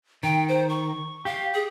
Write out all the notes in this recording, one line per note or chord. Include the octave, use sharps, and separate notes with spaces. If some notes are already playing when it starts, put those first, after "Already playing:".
D#3 G5
C5
C#6
G4 F5
G#4